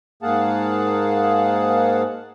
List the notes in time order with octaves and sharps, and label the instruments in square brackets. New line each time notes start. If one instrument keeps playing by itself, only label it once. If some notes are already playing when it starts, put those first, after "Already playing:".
[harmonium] G#2 A#3 G#4 F5 F#5 A5